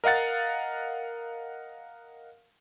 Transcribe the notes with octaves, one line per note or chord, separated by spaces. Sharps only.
A#4 D#5 F5 F#5 A6